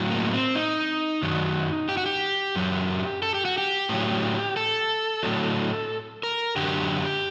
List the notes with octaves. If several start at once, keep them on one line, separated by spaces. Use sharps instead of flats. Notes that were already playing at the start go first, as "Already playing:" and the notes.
Already playing: A2 F#3
A#3
C4
D#4
F#2 D#3 F#3
G4
F#4
G4
F#2 F#3
A4
G4
F#4
G4
A2 F#3
A4
A2 F#3
A#4
F#2 D3 F#3 G4